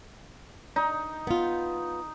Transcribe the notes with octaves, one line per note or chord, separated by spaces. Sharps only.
D#4
B3 F4